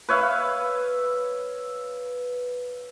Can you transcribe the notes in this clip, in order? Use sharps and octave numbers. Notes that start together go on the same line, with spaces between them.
B4 C#5 E5 F5